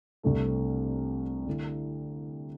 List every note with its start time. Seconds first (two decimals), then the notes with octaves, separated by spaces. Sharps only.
0.23 C2 C3 A3 D4 A4
1.46 D3 A3 E4